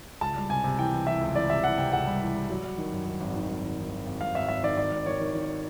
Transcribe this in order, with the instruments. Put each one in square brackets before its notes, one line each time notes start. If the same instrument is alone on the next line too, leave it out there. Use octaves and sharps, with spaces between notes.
[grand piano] C#2 A5
G3
C3 G#5
C3
E3 G5
E3
E3 E5
C#2
E3 D5
C3 E5
E3 F#5
C3 G5
C#2 F#5
G3
E3
G3
F#3
F#3
D#3
F#2
D#3
G#1
D#3
G#1
D#3
D#3
G#1
G#1
G#1 F5
G#1 E5
G#1 E5
D#3 D5
G#1 D5
G#1
D#3 C#5
D#3
D#3